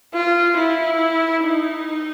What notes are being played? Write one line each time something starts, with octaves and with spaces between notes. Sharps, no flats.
F4
E4
D#4